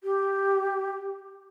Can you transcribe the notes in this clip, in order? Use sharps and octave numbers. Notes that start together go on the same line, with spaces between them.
G4